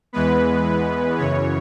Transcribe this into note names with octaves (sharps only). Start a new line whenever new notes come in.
E2 E3 G#3 B3 B4
F#2 C#3 E3 C#5